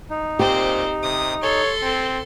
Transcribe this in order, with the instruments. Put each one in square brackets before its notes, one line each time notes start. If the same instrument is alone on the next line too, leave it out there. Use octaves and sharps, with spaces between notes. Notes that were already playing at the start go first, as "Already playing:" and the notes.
[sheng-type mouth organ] D#4
[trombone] A#2 [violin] C4 C5 [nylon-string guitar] G4
[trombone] C3 [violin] D#6
[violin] A4 C6 [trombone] C#5
[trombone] C4